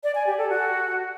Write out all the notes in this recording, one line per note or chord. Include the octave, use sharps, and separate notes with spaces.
D5
G#5
G4
A4
F#4